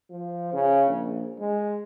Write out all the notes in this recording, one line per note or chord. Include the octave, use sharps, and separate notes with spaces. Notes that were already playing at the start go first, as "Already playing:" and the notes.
F3
C#3
A#1
G#3